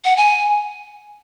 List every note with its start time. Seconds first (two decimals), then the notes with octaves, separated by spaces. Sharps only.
0.05 F#5
0.17 G#5